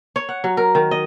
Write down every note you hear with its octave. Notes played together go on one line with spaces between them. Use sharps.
C#5
F#5
F#3
A#4
D#3
D#5